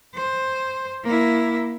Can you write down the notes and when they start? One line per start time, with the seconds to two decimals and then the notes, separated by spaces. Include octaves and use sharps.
0.15 C5
1.04 A#3 E4